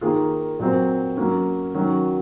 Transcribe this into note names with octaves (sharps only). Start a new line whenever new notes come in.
D#3 A#3 F4 G#4
A#2 F#3 C4
F#3 A#3 C#4
D#3 F#3 C#4 F#4